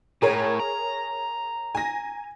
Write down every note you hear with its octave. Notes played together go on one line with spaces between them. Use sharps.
A2 G#4 A#4 C#5
A#5
G#5 A#6